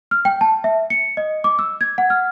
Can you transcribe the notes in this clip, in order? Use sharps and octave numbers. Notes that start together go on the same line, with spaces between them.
F6
G5
A5
E5
C#7
D#5
D6
E6
G#6
F#5
F6